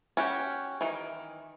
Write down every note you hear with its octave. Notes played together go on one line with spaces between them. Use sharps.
C#4 F#4 G4
D#3 E3